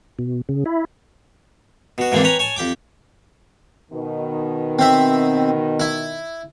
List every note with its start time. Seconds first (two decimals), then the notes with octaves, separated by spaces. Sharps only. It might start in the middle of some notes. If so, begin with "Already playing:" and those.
0.19 B2
0.49 C#3
0.66 E4
1.98 B2 F#4
2.12 G#2 E3 A#3 C4 D4
2.24 B4 C#5 G5 G#5 A#5
2.39 C#5 G#5 A5
2.56 F2 G4 G5 D6
3.92 B2 D#3
4.79 C4 E5
5.80 E4